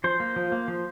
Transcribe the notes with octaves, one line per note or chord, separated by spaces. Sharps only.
F3 C5
A#3
F3
A#3
F3